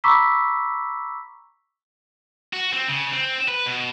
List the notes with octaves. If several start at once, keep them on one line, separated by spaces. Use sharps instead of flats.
A#5 B5 C#6 D6 E6 B6
F#4
C4
C#3
C4
B4
B2